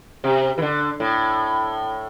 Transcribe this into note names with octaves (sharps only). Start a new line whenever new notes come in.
C3
E3
D3
A2